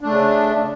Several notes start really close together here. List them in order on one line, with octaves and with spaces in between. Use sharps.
D4 A3 C#3